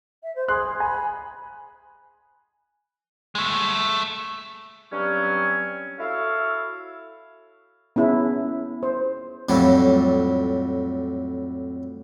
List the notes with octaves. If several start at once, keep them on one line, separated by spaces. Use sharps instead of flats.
E5
C5
G#4 C6 F#6
G#5 B5
G#3 A3
G2 F#3 C4 C#4
E4 F#4 A4 C#5 F5
B3 C#4 E4 G#4
C5
F2 A2 F#3 G3